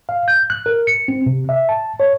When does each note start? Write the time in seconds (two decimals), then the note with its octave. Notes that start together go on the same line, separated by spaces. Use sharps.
0.09 F5
0.28 G6
0.50 F#6
0.66 A#4
0.87 C#7
1.08 C4
1.26 C3
1.49 E5
1.69 A5
2.00 C#5